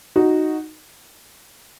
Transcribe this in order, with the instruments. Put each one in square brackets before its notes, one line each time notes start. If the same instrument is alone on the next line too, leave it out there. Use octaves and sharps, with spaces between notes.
[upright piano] D#4 F#4